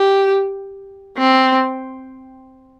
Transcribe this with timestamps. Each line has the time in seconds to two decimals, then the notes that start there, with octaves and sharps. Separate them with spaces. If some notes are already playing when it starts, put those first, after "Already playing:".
Already playing: G4
1.17 C4